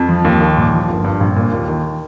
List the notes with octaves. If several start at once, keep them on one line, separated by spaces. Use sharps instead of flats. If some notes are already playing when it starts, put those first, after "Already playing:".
Already playing: F2
F3
D#2
D#3
A#2
F3
G1
G2
A#1
A#2
D#2
D#3